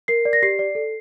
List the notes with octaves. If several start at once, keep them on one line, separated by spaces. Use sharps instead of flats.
A#4 C7
D5
A#6
G4 C7
D5
A4